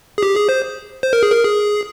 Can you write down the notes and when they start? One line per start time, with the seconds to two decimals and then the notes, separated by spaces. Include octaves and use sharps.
0.18 G#4
0.23 G4
0.35 G#4
0.49 C5
1.03 C5
1.13 A#4
1.23 G#4
1.32 A#4
1.45 G#4